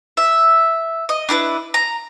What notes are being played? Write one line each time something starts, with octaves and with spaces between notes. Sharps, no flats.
E5
D#5
D4 E4 A#4 B4
A#5